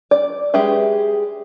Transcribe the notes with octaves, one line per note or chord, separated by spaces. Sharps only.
D5
G#3 G4 G#4 B4 E5